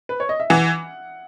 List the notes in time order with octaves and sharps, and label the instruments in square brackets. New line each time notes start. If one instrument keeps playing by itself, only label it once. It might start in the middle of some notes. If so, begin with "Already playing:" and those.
[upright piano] B4
C#5
D#5
E5
[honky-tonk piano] E3 [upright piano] F#5